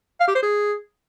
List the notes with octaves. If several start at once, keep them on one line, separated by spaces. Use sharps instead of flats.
F5
G4
C5
G#4